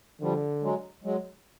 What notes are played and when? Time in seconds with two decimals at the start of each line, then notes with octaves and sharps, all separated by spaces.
0.21 D3 F3 G3
0.62 F#3 G#3
1.04 F#3 G#3